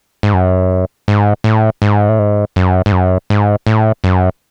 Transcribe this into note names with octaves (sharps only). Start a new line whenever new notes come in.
G#2
F#2
G#2
A2
G#2
A2
G#2
F#2
G#2
F#2
G#2
A2
F#2